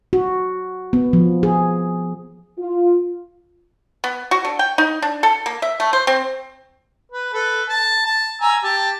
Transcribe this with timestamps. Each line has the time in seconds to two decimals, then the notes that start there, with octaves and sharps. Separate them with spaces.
0.13 F#4
0.93 B3
1.13 F3
1.43 G#4
2.58 F4
4.04 B3
4.31 F#4
4.45 D3
4.59 G5
4.78 D#4
5.02 D4
5.23 A4
5.46 A#3
5.62 E5
5.80 A3
5.93 C5
6.07 C4
7.11 B4
7.34 A4 B4
7.69 A5
8.06 A5
8.41 G#5 A#5 E6
8.63 G4 A5